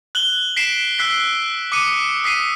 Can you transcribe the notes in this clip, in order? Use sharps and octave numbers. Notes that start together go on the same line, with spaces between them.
F#6 F#7 G7
B6 C7 D7 E7
E6 F#6 B6 C7
D6 D#6 C#7 D#7
D#6 B6 C7 D#7